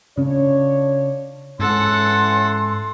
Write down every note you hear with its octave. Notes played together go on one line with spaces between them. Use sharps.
C#3 C#4 D4 F4 C#5
G#2 E3 C#4 A4 F#5 C6